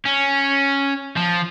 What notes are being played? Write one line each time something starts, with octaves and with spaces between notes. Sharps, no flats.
C#4
F3